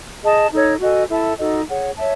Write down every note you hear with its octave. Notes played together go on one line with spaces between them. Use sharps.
G#4 D#5 A5
D#4 A4 C#5
F#4 A4 D#5 G#5
E4 A4 E5 A5
D#4 F#4 A4 D#5
G#4 C#5 F#5
C#5 E5 A5